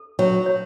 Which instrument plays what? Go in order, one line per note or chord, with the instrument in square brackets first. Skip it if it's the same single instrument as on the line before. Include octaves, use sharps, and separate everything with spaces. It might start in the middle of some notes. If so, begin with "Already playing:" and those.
Already playing: [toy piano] A4
[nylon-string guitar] F#3 [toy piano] C#5
[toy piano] C#5